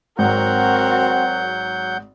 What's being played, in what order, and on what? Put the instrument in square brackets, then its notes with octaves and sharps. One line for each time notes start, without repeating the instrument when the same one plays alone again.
[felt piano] G#1 G#2 [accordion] F#3 F#5 G6 [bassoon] C4 [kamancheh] F#4 A#4